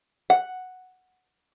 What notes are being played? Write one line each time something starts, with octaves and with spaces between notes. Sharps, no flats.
F#5